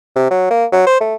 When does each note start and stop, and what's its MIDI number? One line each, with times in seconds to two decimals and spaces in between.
0.16 0.26 48
0.30 0.48 54
0.51 0.65 58
0.72 0.83 54
0.87 1.00 72
1.01 1.15 57